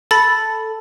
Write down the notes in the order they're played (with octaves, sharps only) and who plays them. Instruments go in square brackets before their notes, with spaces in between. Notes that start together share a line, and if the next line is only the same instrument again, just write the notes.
[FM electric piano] A4 [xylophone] B5 A6